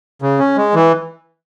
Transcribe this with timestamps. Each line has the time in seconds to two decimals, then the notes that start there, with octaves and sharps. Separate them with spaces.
0.22 C#3
0.39 C#4
0.57 G#3
0.74 E3